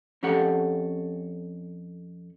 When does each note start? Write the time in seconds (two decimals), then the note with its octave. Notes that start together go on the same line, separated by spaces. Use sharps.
0.23 F2 C#4 G4 A4 F#5